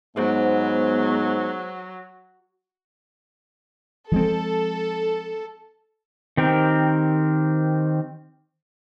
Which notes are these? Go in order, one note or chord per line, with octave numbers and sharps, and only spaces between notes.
G#2 F#3 B3 G#4 C5
F3 G#3 C4 A4
D#3 C4 G4 A#4